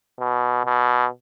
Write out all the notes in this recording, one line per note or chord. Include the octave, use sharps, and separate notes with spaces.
B2
B2